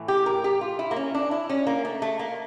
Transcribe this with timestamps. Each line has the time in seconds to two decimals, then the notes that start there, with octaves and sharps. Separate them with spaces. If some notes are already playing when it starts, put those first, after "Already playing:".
Already playing: A2 E3 A3
0.08 G4
0.26 A#4
0.44 G4
0.61 F4
0.79 E4
0.91 A#3
0.96 C#4
1.15 D4
1.31 E4
1.50 C#4
1.67 A#3
1.85 A3
2.02 A3
2.19 A#3